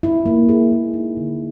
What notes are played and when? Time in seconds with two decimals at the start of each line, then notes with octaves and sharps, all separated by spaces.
0.03 E4
0.26 A#3
0.49 G#4
0.72 A#3
0.94 D#4
1.17 D3